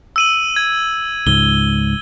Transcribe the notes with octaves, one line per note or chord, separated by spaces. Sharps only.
E6 D#7 F#7
G#6
C#2 G#2 G7